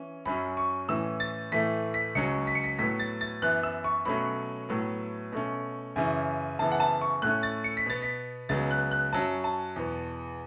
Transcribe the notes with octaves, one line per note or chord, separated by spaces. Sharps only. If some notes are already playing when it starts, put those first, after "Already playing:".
Already playing: E3 C#4
F#2 F#3 C#4 B5
C#6
A2 E3 C#4 E6
A6
A2 E3 A3 B6
B6
C#2 C#3 F#3 C#4 C#7
B6
C#7
B6
A2 F#3 B3 B6
A6
A6
F#2 E3 B3 F#6
E6
C#6
B2 F#3 A3 C#4 B5
A2 F#3 B3
B2 A3 C#4
F#2 C#3 E3 C#4
F#2 C#3 E3 B3 A5
F#5
A5
C#6
A2 A3 C#4 F#6
A6
C#7
B6
B2 B3 A6
B6
C#2 C#3 F#3 B3 A6
F#6
F#6
F#2 F#3 C#4 A5
A5
E2 B2 B3